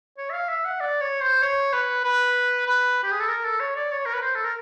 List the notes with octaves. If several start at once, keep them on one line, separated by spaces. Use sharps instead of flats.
C#5
E5
F5
E5
F#5
D5
C#5
C5
C#5
B4
B4
B4
G4
G#4
A4
A#4
A4
C#5
D5
C#5
A#4
B4
C5
A4
A#4